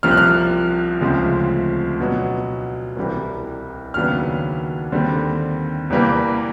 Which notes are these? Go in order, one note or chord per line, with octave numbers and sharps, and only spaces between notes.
C2 C3 F3 F6
F#6
F6
D2 C#3 F3 G#3 C4
B2 F#3 B3 D4
C2 C3 E3 G3
D#2 C#3 F#3 B3 D4 F6
D#2 D3 G3 C4
E2 C3 E3 G3 A#3